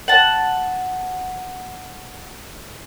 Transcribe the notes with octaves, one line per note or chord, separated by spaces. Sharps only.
F#5 A5